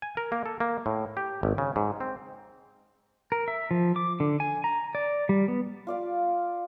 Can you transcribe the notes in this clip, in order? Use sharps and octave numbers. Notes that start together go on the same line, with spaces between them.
G#5
A#4
A#3
A4
A#3
A2
G4
G#1
C#3
G#2
C4
A#4
E5
F3
D6
D3
G#5
A#5
D5
G3
B3
F4 D5 F5